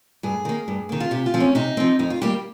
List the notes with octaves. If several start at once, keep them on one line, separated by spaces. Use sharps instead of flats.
G2 G#4
D#3 A#3
G2
D#3 A#3
F4
C3 G4
F4
F3 C4
C#4
C3 D#4
F3 C4
F2 D#4
F4
D#3 G3 A#3 G4